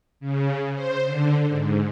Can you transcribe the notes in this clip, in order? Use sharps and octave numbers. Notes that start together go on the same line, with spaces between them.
C#3
C5
D3
G#2